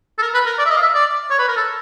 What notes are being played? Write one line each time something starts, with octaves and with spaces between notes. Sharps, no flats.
A4
A#4
B4
A#4
D5
E5
D#5
F5
E5
D5
C#5
B4
A#4
A4